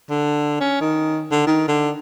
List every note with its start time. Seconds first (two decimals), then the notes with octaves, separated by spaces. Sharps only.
0.10 D3
0.61 C#4
0.81 D#3
1.32 D3
1.47 D#3
1.68 D3